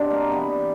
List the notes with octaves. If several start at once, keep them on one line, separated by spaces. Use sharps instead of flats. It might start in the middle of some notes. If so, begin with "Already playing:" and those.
Already playing: B2 G3 C4 D4
A#3
C3 E3 G3 B3